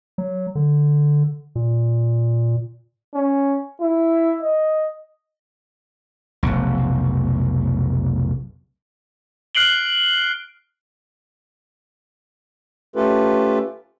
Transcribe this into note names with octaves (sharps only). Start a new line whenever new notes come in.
F#3
D3
A#2
C#4
E4
D#5
F1 B1
F6 F#6 C7 D7 F#7 G7
A3 C#4 F4 G4 A4 B4